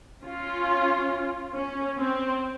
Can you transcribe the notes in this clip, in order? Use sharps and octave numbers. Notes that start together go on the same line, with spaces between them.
C#4 F4
C#4
C4